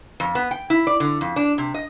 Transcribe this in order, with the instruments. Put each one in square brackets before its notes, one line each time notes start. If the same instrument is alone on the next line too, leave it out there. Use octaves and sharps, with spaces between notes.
[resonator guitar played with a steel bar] F2
B3
G5
E4
D5
D3
F2
D4
C3
D#5